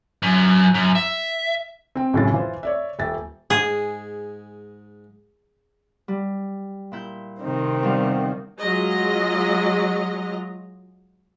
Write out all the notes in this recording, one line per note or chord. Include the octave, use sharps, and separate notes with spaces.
F#2
F#2
E5
C4 G5
A1 F#2 A2 C#3 G#3 A6
E3 F4 C5
C#5 D5 E5
D#1 E5 G5 A6
G#2 G#3 G#4
G3
A#2 E4 G6
C3 D#3 C4
E2 G3 F5
F#3 G#3 F4 D#5